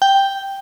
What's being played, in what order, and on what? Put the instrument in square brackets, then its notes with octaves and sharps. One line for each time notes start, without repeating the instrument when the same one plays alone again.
[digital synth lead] G5